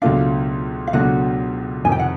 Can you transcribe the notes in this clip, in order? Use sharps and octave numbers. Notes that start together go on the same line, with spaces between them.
C#2 B2 F#3 A3 D4 F4 F5
F5
C#2 B2 F#3 A3 D4 F#4 F#5
F2 C3 D#3 G#5
G5
F#5